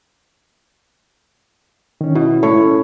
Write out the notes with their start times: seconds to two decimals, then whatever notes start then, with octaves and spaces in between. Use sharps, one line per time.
2.01 D#3 C#4
2.15 B2 E4
2.43 A2 C#5
2.59 C#4